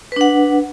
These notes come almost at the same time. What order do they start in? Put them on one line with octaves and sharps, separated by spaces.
B4 D4 F#5